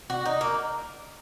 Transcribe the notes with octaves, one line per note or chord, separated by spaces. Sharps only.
F#4
D#4
A#3